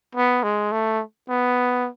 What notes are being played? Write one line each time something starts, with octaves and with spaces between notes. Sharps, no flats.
B3
G#3
A3
B3